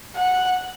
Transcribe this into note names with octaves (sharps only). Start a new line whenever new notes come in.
F#5